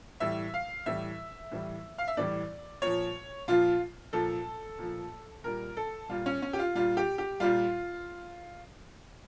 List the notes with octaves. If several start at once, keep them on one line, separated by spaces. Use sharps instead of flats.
A2 E3 G3 E5
F5
A2 E3 G3 E5
A2 E3 G3
F5
E5
A2 E3 G3 D5
A#2 F3 C#5
A#2 F3 F4
A#2 F3 A4
A#2 F3
A#2 G3 A#4
A4
A#2 G3 F4
C#4
C#4
G4
F4
A#2 G3 F4
G4
G4
A#2 G3 F4